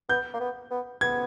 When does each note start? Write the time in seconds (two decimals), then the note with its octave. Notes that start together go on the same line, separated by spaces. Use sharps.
0.09 B3 G6
0.34 A#3
0.40 B3
0.71 B3
1.01 B3 G#6